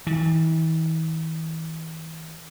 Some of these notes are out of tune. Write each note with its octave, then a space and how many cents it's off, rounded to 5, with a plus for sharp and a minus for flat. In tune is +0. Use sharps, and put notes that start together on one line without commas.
E3 -40